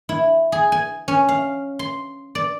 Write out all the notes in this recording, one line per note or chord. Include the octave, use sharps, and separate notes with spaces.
E4
G#4
G#5
C#4
F5
C6
D5